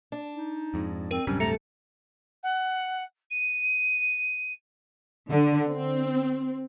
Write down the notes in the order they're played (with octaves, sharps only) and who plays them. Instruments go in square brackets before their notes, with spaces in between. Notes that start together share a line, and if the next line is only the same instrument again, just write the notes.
[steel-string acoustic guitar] D4
[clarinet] D#4
[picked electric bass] F2 G#2
[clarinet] C4 [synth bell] A#4 D#7
[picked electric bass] D1 G2 C3 [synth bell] F#3 [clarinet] C#4
[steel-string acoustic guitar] A3 [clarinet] A#5 [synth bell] C#7
[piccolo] F#5
D#7
[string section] D3
C4